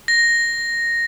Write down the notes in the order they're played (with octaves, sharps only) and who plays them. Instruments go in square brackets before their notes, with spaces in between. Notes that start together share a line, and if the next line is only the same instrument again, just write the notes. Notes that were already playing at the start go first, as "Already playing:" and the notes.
[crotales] A#6